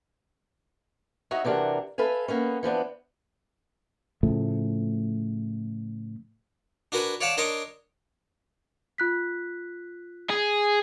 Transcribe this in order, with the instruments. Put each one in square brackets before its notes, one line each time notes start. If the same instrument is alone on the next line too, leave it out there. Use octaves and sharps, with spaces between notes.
[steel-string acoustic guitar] D#4 F#4 C#5 D#5 E5
C3 E3 D4 F#4 A#4
A4 B4 E5 F5 G#5
A#3 B3 C#4
E3 F3 B3 D4
[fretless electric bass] A2 C#3 F3 A3
[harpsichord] D4 F#4 A#4 B4 G#5
C#5 D5 F5 F#5 A5
D4 A#4 C#5 D#5 C6 D6
[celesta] F4 F#6 B6
[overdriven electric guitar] G#4